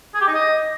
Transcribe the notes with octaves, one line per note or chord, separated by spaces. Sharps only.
G#4
G4
D#4
D#5